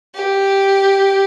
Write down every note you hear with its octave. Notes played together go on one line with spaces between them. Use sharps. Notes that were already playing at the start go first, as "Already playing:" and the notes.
G4